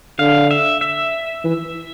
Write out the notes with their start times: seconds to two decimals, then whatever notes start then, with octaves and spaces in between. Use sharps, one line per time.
0.19 D3 F5
0.51 E5
0.81 E5
1.44 E3